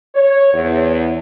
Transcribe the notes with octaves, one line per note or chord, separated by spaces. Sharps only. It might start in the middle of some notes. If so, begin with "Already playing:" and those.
C#5
E2